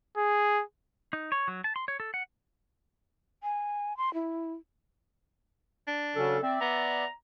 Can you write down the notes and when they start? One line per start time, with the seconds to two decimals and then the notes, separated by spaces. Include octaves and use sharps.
0.17 G#4
1.13 D#4
1.32 C#5
1.48 F#3
1.64 A5
1.76 C6
1.88 C#5
2.00 A4
2.14 F#5
3.42 G#5
3.97 C6
4.14 E4
5.88 D4
6.16 C#3 F#3 C#4 A4
6.43 C4 D5 E5
6.61 B3 A#5